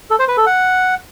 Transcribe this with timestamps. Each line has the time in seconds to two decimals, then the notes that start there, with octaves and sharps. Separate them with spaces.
0.10 A4
0.19 C5
0.28 B4
0.37 A4
0.46 F#5